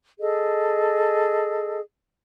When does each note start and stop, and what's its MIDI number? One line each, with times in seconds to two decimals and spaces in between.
0.20 1.80 68
0.20 1.80 69
0.20 1.80 75